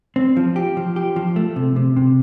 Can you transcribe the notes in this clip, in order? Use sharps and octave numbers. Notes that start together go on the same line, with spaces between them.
C4
F3
G4
F3
G4
F3
A3
C3
C3
C3